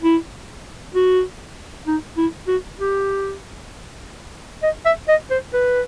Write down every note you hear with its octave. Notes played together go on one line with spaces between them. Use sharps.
E4
F#4
D#4
E4
F#4
G4
D#5
E5
D#5
C5
B4